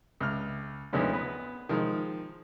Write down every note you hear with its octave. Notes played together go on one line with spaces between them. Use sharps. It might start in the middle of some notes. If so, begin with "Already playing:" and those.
C#2 F6
D2 D#3 F3 G#3 B3 C#4
B3 B4
D#3 F3 G#3